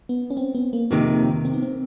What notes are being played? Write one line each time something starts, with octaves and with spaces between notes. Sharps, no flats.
B3
C#4
C4
B3
A#3
F2 C3 D#3 A#3
C4
B3
C4